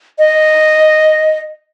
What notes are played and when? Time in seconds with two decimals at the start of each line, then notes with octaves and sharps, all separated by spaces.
0.19 D#5